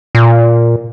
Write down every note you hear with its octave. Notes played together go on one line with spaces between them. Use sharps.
A#2